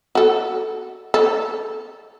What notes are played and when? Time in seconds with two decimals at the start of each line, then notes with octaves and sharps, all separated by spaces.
0.15 F#4 A4
1.14 A4